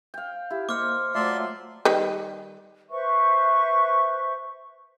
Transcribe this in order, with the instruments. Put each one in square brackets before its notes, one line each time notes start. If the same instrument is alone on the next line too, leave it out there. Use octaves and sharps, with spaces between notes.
[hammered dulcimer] F5 G5
[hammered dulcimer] E4 [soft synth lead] G4
[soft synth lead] A#3 [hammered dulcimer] C5 D#5 C#6 [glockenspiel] D6 F6
[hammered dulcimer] F3 F#3 [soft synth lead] A3 [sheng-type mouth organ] D5 E5 C6
[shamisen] D#3 G3 B4
[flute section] B4 C5 E5 C#6